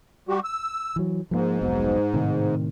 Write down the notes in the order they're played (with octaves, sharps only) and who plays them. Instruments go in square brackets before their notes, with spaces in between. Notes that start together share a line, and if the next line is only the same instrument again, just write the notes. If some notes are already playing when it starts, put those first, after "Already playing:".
[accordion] G3 F#4 G4
E6
[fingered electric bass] E3 F#3
[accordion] G#2 [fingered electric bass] F3 G#3 A#3
[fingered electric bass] F1 B1 B2
A2 C3 D#3